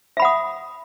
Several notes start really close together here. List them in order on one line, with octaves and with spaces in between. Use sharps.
E5 B5 F#5 D#6